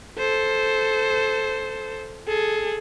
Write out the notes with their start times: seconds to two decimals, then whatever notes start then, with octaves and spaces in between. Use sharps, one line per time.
0.18 A4 C5
2.28 G#4 A4